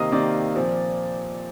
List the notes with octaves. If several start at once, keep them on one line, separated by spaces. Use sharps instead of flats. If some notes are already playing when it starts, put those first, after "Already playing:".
Already playing: C3 D#3 A#3 D#5 F5 D#6
C3 D#3 A#3 D5 D6
A#2 F3 C4